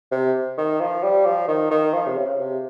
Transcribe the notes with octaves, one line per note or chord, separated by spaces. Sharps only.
C3
D#3
F3
G3
F3
D#3
D#3
F3
C3
C#3
C3